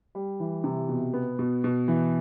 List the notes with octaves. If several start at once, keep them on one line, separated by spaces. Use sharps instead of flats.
G3
E3
C3
B2
B3
B2
B2
E3